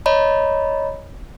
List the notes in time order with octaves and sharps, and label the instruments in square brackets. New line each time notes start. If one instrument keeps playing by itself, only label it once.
[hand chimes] C#5 D#5 A#5 B5